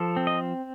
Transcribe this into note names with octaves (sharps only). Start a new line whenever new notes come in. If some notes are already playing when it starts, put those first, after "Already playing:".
Already playing: F3 A4
C4
D#5